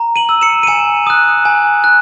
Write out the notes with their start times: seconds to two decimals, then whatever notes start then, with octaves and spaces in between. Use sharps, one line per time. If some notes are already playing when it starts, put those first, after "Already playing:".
Already playing: A#5
0.16 D#7 F#7
0.29 E6
0.41 C#7 E7
0.63 D#7
0.67 G#5 C#7 E7
1.07 D#6 F#6
1.45 G#5
1.84 F#6